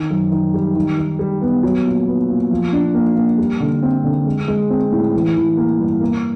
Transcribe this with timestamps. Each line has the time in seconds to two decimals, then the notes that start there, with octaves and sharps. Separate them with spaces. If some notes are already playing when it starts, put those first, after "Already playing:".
Already playing: D#3
0.10 F#2
0.32 D#3
0.54 G3
0.76 D#3
0.98 D#3
1.19 G3
1.41 B3
1.63 F#3
1.85 A#2
2.07 B3
2.29 A#2
2.51 F3
2.73 D4
2.94 A#3
3.16 A#3
3.38 G3
3.60 D3
3.83 C4
4.04 D3
4.26 G#3
4.48 G#3
4.70 C4
4.91 A2
5.14 E3
5.36 E3
5.57 A#3
5.79 G2
6.01 A#3